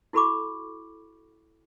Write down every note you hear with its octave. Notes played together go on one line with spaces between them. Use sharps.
E4 F#4 A4 B5 C#6 D6